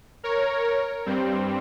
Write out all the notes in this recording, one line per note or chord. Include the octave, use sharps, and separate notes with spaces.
A#4 C#5
G2 G3 C4